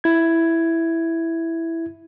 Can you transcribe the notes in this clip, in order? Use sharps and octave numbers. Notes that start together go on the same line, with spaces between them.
E4 G#6